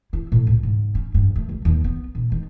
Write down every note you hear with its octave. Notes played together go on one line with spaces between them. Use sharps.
E4
A2
C#2
G#2
C#4
G2
A3
C#2
D#2
B3
A#1
D#3